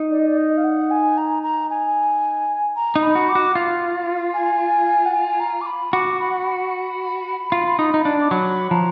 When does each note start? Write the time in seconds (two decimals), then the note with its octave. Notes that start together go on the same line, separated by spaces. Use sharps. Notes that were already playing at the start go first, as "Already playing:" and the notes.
Already playing: D#4
0.11 D5
0.19 D#5
0.27 D5
0.37 D#5
0.57 F5
0.64 F#5
0.91 G#5
1.18 A#5
1.43 A#5
1.70 G#5
2.76 A#5
2.96 D#4
3.02 B5
3.15 F#4
3.29 D6
3.35 F#4
3.55 F4
4.34 G#5
5.06 F#5
5.13 G#5
5.28 G#5
5.40 A#5
5.61 D6
5.66 B5
5.93 F#4 D6
6.20 B5
6.47 B5
7.52 F4
7.79 D#4
7.94 D#4
8.05 D4
8.21 D6
8.31 F#3 B5
8.71 F3 A#5